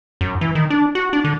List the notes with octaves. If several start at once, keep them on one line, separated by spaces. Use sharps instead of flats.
F#2
E3
D#3
D4
F#4
D4
D3